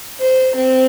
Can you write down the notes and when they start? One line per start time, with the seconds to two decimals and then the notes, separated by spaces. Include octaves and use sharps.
0.20 C5
0.55 C4